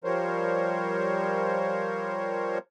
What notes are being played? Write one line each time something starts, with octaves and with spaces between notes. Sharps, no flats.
F3 G3 A#4 C5 C#5